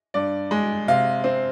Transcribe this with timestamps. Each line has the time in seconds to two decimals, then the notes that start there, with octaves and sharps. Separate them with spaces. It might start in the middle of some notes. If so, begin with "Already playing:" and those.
0.14 G2 D5
0.51 G#3
0.88 C3 F5
1.24 C4